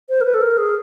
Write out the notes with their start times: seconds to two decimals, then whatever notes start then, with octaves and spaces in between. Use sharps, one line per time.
0.09 C5
0.21 A#4
0.25 B4
0.34 A4
0.42 A#4
0.58 G#4